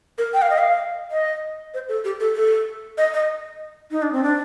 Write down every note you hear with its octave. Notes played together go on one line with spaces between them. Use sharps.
A#4
G5
F5
D#5
F5
D#5
C5
A4
G4
A4
A4
D#5
D#5
D#4
D4
C4
D4